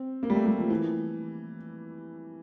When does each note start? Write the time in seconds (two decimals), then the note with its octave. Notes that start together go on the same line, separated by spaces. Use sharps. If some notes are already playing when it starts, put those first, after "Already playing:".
Already playing: C4
0.23 A#3
0.30 G3
0.35 A3
0.46 G3
0.59 F3
0.70 E3